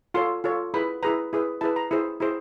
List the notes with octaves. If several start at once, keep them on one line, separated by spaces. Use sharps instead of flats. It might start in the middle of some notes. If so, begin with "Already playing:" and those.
F4 A4 C#5 C6
F4 A4 C#5
E4 G#4 B4 B5
E4 G#4 B4 A#5
E4 G#4 B4
E4 G#4 B4 A5
A#5
E4 G#4 C5
E4 G#4 C5